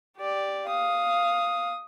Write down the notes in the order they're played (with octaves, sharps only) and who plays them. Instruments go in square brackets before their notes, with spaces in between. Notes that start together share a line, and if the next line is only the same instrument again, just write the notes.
[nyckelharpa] G4 D5
[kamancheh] F5 [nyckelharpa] D#6